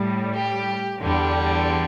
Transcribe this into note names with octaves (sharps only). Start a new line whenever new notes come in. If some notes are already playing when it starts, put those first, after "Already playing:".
Already playing: A2 G3
G4
E2 D3 G3